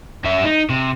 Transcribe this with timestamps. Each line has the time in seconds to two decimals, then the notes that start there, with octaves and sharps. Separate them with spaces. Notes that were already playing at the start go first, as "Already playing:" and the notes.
0.24 F#2 E5
0.44 D#4
0.70 C3